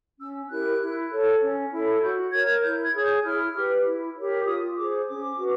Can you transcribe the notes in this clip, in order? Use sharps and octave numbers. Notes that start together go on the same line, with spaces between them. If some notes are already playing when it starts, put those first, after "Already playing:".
C#4 E6
E4 G4 A#4 F#6
E4
A4 C#5
C#4
E4 A4 C#5
F#4 G6
A#4 C#5 G#6
E4 G6
G#6
G#4 C#5
G6
E4 F6
G4 B4
E4
G4 A#4 C#5
F4 D#6
G#4 C5 D6
C#4 D6
F#4 B4